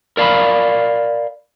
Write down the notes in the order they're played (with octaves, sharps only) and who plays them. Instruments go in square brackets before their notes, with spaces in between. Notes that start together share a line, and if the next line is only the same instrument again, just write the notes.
[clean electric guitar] A#4 D5 F5 A#5 B5